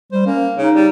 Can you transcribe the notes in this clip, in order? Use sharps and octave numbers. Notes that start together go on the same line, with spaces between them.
G3 C5
A#3 C#4
C#3 D#4
G3